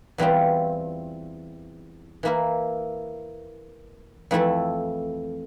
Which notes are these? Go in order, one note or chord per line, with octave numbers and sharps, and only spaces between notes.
E2 E3 G3 C4 F4
E3 A#3 E4 A#4
F2 E3 A3 E4 A4